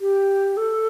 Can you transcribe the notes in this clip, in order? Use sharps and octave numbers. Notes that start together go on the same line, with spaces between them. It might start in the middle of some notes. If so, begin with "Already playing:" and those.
G4
A4